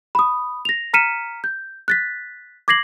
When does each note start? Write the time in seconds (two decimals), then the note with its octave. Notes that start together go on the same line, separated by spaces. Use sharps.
0.15 B5 D#6
0.65 A#6 F7
0.94 A#5 F6 B6 C#7 D#7 E7
1.44 G6
1.88 F#6 A6 B6
2.68 D6 G#6 A#6 C7 F#7